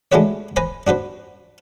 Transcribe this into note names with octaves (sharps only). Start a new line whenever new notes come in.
G#3 A3 D4 F#4 B4 C#5
B4 C5 G#5 A#5 B5
D4 F#4 B4 C5